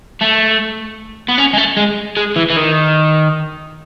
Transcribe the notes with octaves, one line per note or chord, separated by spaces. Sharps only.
A3
B3
C#4
G#3
A3
G#3
G#3
E3
E3
D#3